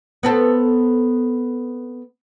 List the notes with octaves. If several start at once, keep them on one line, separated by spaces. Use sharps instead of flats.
B3 C4 A4